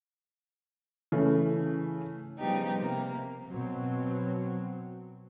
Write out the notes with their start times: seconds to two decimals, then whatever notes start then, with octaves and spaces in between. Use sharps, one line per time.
1.12 C#3 E3 A3 A4
2.39 C#3 F3 G3 B3 D#4 G4
2.78 C3 A#3
3.48 B2 F#3 C4